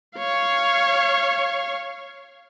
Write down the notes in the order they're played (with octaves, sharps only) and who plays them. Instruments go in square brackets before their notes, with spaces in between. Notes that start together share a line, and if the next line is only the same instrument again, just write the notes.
[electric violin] C#5 F5